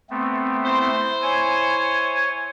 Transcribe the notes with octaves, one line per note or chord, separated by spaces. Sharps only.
A3 B3 C4
E4 C5
C#5 G#5